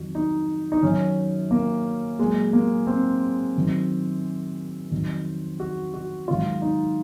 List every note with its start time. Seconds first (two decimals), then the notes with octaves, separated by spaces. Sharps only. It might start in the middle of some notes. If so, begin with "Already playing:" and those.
Already playing: F2 D#3 F#3 F#4
0.15 D#4
0.72 D#4
0.82 F#2 D#3 F#3 C#4
1.51 A#3
2.19 A#2 F#3 G#3
2.53 A#3
2.87 C4
3.56 F#2 D#3 F#3
4.91 F2 D#3 F#3
5.60 F#4
5.94 F#4
6.28 G#2 D#3 F#3 F4
6.62 D#4